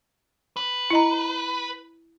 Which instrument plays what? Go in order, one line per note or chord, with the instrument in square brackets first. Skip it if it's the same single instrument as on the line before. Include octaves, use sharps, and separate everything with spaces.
[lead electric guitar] B4
[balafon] E4 D#5 A#5